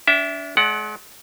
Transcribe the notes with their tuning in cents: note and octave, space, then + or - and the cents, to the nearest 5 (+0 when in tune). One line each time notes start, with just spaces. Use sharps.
D4 -35 E5 +0 G5 +0
G#3 +40 D5 +0 F#5 +0